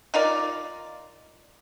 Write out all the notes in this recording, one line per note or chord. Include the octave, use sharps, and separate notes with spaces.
D#4 F4 A#4 D5